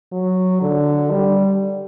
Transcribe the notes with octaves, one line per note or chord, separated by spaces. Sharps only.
F#3
D3
G3